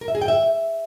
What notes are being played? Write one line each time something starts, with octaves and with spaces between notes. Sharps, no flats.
A#4
E5
G#4
G5
E5